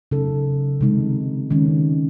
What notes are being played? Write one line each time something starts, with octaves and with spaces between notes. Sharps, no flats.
C#3 F#3 A3 D#4 A4
C3 D#3 G#3 D#4
D#3 G#3 C#4